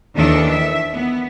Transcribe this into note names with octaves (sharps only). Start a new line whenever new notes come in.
D#2 D#3 E3 D4 A4
E5
B3